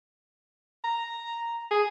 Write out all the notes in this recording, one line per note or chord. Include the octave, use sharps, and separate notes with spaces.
A#5
G#4